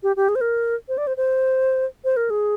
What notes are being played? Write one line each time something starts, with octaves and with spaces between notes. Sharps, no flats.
G4
G4
G#4
C5
A#4
C5
D5
C5
C5
C5
A#4
G#4